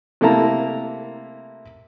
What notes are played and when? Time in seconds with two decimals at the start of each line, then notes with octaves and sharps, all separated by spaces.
0.21 C3 A3 A#3 E4 A5 A#5